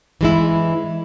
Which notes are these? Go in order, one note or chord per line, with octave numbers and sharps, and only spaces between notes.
E3 G#3 E4